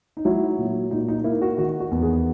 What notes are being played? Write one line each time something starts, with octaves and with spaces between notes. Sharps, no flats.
D#4
F#3 E4
A#2
A#2 D#4
D#4
A#3 E4
F#4
D#3 F#4
F#4
E2
G#4